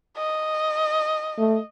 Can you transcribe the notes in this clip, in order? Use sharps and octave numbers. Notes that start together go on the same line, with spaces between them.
D#5
A3